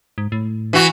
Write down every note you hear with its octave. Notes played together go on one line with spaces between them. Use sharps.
G#2
A2
E3 F#4